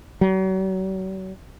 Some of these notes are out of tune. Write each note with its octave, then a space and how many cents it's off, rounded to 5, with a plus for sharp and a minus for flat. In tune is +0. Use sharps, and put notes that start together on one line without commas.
F#3 +40